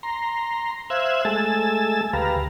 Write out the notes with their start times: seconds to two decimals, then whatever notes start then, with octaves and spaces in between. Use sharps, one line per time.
0.03 A#5 C6
0.90 C5 E5 F5 E6 F#6 G#6
1.25 G#3 A3 G#5 A5 E6 A6
2.13 D2 G4 B4 F5 A#5